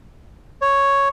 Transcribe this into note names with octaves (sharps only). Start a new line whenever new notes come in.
C#5